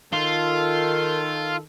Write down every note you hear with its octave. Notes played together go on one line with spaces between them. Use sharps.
D#3 F4 A4